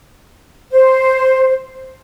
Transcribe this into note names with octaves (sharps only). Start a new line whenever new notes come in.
C5